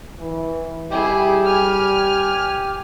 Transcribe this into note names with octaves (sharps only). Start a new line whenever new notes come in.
E3
G3 E4 G4 G#4
G#5 F6